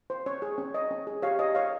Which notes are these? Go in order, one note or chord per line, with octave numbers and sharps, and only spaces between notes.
C5
C#4 C#5
G#4
C#4
C#5 D#5
C#4
G#4
G4 C#5 F5
C#5 D#5
C#5 F5